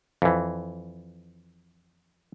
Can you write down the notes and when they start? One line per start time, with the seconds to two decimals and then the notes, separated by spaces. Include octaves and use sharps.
0.22 F2 E3